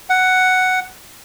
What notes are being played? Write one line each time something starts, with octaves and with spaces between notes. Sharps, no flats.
F#5